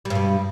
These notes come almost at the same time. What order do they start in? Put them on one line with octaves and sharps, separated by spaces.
G3 G2 B2